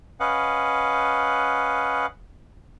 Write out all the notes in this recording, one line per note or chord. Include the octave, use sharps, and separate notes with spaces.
C#4 B4 D#5 F5 F#5